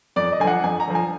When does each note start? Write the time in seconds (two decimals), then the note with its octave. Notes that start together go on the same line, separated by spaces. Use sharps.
0.16 F2 D5
0.33 D#5
0.40 D3 G#5
0.44 F3 F#5
0.64 F2 G#5
0.80 A#5
0.87 D3 F3
0.95 G#5